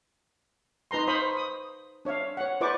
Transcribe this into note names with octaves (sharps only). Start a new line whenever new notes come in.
D#4 B4 A#5 C6
C5 F5 B5 C#6 D#6
D#6
D4 C#5 E5 F5
C#5 F#5
E4 B4 C5 D5 C#6 D6